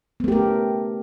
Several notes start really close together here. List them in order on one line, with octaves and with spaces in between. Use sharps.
B3 A3 G4 A#4 C#4